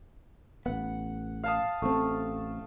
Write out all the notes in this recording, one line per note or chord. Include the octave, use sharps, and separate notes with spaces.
A1 B3 F#5
F5 A5 D#6
A1 A3 C4